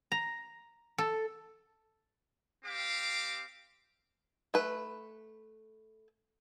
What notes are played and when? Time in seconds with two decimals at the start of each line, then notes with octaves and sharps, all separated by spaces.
0.12 A#5
0.98 A4
2.64 C4 G4 F5 D6
4.54 A3 B4